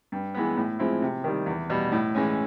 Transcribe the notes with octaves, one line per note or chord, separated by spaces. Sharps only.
G2
E3 G#3 B3
A2
F3 G#3 C4 E4
C3
D#3 G3
E2
B2 G3
A2
E3 G#3 C#4